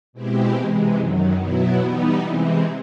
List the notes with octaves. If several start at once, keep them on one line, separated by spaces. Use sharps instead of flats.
B2 G#3 C4 E4 G4
C3 E3 G#3
F#2 D#3 F#3
B2 F#3 B3 E4
E3 G3 B3 D#4
C3 E3 G#3 C4